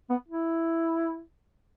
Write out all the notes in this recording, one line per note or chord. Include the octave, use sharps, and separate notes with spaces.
B3
E4